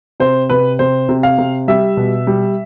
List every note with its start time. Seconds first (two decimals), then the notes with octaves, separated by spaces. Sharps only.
0.20 C3 C5
0.49 C3 B4
0.79 C3 C5
1.09 C3
1.23 F5
1.38 C3
1.68 G3 E5
1.97 B2
2.27 G3